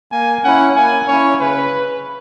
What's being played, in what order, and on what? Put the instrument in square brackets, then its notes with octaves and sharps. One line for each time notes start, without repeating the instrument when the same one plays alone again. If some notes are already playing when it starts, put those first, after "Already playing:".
[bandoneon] A#3 [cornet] G#5
[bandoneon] C#4 E4 [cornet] F#5
[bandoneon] A#3 [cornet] G#5
[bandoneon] C#4 E4 [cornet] C#5
[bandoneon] C#3 [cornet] B4